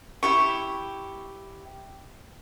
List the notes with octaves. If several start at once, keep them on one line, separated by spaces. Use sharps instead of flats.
E4 G4 C#6